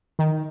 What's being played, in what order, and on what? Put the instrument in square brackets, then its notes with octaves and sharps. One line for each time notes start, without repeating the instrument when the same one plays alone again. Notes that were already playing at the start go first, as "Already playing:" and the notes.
[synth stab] D#3